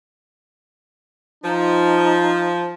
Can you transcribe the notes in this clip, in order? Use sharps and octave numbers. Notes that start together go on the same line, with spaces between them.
F3 D#4